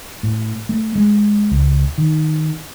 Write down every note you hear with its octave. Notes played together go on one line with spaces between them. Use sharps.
A2
A3
G#3
C#2
D#3